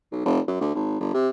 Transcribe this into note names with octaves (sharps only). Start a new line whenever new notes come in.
B1
F1
F#2
D2
G#1
G1
C3